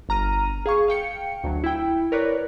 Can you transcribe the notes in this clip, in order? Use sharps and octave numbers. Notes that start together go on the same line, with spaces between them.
G1 A#5 F6 D#7
G#4 F5 C#6
F5 G5 C#7
D2 F#3
E4 G5
A#4 B4 C#5 D5 F#6